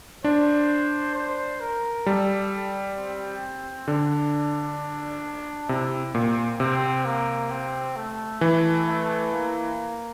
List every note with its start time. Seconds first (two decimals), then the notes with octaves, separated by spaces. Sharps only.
0.24 D4 C5
1.15 C5
1.60 A#4
2.06 G3 A4
2.97 C4
3.88 D3 D4
5.69 C3 E4
6.15 A#2 C4
6.60 C3 C4
7.05 A#3
7.51 C4
7.96 A3
8.41 E3 A3
8.87 A3
9.32 A#3